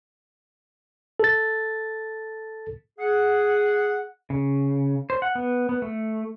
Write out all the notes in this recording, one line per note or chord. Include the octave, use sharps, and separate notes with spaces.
A4 A6
G#4 F#5
C#3
C5
F#5
B3
B3
A3